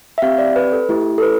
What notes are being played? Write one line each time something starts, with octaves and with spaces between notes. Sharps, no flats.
E5
C4 G4 F5
D5
B4
A4
A3 E4 G4
A4
B4